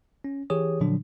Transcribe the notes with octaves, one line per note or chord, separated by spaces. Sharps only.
C#4
E3 G4 G#4 C#5 D#6
A#2 D3 F3 F#3 D4